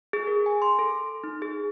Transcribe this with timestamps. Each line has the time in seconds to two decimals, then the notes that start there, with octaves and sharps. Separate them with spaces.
0.13 G#4
0.27 A#4
0.46 G#5
0.62 C6
0.79 A4
1.24 D#4
1.42 G#4